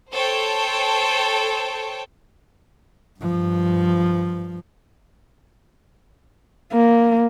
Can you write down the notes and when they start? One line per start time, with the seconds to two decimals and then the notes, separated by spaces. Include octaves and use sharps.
0.11 A4 C5 C#5 G5
3.20 G2 F3
6.73 A#3